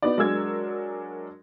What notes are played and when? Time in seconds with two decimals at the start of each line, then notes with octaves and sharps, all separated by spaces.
0.02 B3 D#4 F#4 D5
0.18 F#3 G#3 D4 A#4 E6 G#6